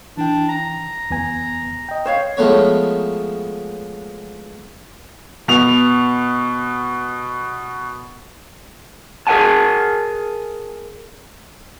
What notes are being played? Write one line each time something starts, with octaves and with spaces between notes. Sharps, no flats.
E3 D4 G5
A#5
E2 B3 G#5
D#5 G5
C5 C#5 F5
F3 G#3 A3 B3 C#5
B2 F7
G#4 A#4 E5 F#5 G#5 A5